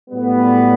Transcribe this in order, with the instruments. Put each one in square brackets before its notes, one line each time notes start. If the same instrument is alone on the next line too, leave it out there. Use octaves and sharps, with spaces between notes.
[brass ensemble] A2 F#3 G3 B3